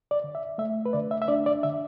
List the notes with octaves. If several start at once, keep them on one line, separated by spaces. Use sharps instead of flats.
D5
D3
E5
A3 E5
B4
D3 D5
E5
E5
D4 D5
D5
D3 E5